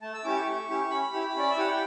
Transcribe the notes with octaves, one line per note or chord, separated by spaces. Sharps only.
A3 A5
E6
C#4 E4 G4 D6
C#6
A3
C#4 E4 G4
C#4 B5
E4 G4
C#4 D5
E5
E4 G4 F#5
G5